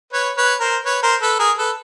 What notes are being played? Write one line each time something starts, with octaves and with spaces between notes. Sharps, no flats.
B4 C#5
B4 C#5
A#4 C5
B4 C#5
A#4 C5
A4 B4
G#4 A#4
A4 B4